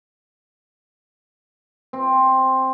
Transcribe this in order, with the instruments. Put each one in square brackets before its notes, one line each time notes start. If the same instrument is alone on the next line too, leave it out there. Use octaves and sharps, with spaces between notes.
[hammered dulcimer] C4